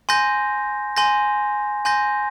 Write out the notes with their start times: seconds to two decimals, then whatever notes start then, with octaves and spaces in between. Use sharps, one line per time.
0.09 G#5 C6 G6 A#6
0.97 G#5 C6 G6 A#6
1.85 G#5 C6 G6 A#6